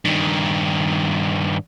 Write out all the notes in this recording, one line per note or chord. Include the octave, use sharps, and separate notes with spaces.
G2 D#3